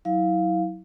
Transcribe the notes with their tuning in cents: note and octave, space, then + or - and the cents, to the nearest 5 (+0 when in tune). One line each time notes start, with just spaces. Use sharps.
F#3 +0 E4 -30 F5 +0